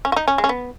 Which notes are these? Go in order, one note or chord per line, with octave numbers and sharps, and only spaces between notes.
C#4
F#4
D#4
C#4
G#3
C#4
B3